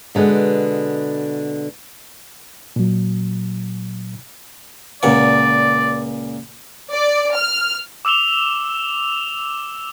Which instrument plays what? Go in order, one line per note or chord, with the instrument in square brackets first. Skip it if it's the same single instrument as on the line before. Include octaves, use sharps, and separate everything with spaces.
[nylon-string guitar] B2 D3 G#3 B3
[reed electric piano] A#2 F#3
[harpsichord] C#2 A#2 F#5 [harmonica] D5
[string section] D5
F6
[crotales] D6 E6 E7 F7 G7